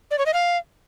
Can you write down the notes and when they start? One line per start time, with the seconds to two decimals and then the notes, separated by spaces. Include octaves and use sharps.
0.11 D5
0.18 C#5
0.26 D#5
0.33 F5